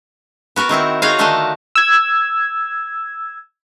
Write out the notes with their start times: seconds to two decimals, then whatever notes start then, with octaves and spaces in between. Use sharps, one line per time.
0.56 B3 F#4 A#4 B4
0.69 D#3 C4 E4 F#5
1.02 D#4 F4 F#4 G#4 C#5 F5
1.19 D3 D#3 A3 D4 D#5 A5
1.76 E6 G#6